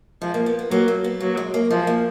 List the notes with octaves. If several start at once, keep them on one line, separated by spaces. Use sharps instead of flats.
F3 G#3
A#3
B3
B3
F#3 A#3
A#3
B3
F#3 A#3
G#3
A#3
F3 G#3
A#3